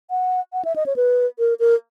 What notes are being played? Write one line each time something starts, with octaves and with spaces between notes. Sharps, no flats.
F#5
F#5
E5
D#5
C#5
B4
A#4
A#4